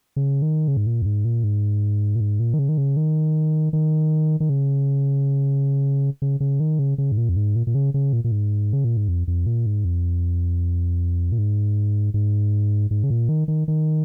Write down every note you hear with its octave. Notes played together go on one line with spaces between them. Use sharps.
C#3
D#3
C#3
G#2
A#2
F2
G#2
A#2
G#2
A#2
G#2
A#2
D#3
C#3
D#3
C#3
D#3
D#3
D#3
C#3
C#3
C#3
D#3
C#3
C#3
G#2
A#2
F2
G#2
A#2
A#2
C#3
C#3
A#2
A#2
G#2
C#3
A#2
G#2
F2
F2
A#2
G#2
F2
A#2
G#2
G#2
G#2
C#3
A#2
D#3
D#3
D#3